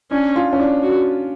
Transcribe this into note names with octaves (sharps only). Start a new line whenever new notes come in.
C#4 D4
F4
C#4
D4
F#4